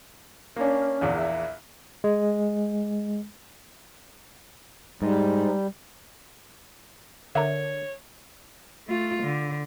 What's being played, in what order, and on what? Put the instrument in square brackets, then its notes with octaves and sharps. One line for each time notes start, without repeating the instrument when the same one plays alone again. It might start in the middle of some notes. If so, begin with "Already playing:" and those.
[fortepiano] A#3 D4 [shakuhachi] C#4
[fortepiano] A#1 E2 A#2
[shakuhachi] E5
[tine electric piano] G#3
[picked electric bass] G#2 [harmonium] G3
[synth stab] D3 [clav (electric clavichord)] A#4 E5 [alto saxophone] C#5
[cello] A3 F4
D3